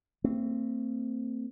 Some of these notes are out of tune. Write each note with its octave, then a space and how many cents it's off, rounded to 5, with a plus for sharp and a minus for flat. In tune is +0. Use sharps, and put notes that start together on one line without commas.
A3 +45 C4 +0